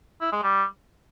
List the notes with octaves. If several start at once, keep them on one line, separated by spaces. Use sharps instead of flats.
E4
G#3
G3